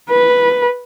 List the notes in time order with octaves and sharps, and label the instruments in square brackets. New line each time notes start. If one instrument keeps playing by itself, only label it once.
[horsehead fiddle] B4